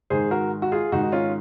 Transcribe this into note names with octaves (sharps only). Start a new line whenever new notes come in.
G#2 D#3 G#4 C5
F#4 A#4
F#4
F4 G#4
G#2 D#3 D#4 F#4
D#4
C#4 F4